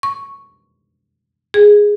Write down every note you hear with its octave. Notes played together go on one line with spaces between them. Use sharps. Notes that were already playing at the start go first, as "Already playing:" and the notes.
C#6
G#4